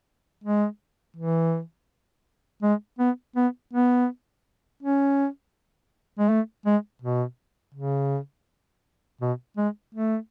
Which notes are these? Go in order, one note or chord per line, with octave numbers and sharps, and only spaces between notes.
G#3
E3
G#3
B3
B3
B3
C#4
G#3
A3
G#3
B2
C#3
B2
G#3
A3